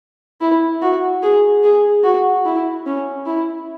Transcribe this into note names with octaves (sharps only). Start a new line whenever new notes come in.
E4
F#4
G#4
G#4
F#4
E4
C#4
E4